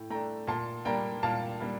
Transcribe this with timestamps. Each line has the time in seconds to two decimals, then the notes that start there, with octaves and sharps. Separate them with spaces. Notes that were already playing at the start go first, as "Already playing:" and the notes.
Already playing: A2 G5
0.10 A3 D4 G5 A#5
0.47 A#2 A5 C6
0.85 G3 A#3 D4 G5 A#5
1.23 A#2 F5 A5
1.60 G3 A#3 D4